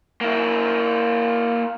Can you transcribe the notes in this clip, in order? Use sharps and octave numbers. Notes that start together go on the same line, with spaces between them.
A#3 E4